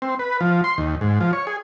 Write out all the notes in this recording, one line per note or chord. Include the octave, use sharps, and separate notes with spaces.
C4
B4
F3
C6
D#2
G#2
F3
C#5
G#4